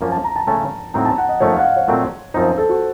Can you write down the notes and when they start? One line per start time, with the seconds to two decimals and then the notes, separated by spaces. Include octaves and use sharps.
0.01 F#2 F3 A#3 C#4
0.12 A5
0.24 A#5
0.36 A5
0.47 C#3 A3 C#4 A5
0.94 A2 F#3 C4 D#4 A#5
1.05 A5
1.18 F#5
1.29 D#5
1.40 F#2 F3 A3 D#4 C#5
1.53 F5
1.59 F#5
1.64 F5
1.76 C#5
1.88 A#2 F#3 A3 C4
2.34 F#2 F3 C4 D#4 C5
2.58 A4
2.69 F#4